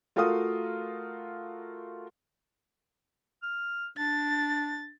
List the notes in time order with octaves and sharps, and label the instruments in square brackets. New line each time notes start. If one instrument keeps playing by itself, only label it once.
[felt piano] A3 F4 F#4 A#4 F5 D#6
[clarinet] F6
[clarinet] D4 [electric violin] A6